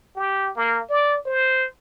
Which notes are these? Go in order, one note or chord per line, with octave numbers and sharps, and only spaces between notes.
G4
A#3
D5
C5